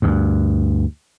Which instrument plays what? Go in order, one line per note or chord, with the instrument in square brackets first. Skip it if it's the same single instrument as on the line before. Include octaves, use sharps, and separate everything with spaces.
[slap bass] D2 G2